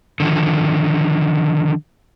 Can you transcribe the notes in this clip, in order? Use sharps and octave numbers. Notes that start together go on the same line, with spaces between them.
D3 D#3 F3